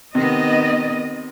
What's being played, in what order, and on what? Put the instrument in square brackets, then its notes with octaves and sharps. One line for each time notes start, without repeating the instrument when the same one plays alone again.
[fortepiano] C3 [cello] D#3 B3 [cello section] D#5